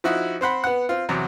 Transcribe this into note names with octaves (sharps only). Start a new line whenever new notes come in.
F3 D#4 E4 F#4
C4 C5 F#5 B5
B3 F#5
C4 F4
E2 C3 F#3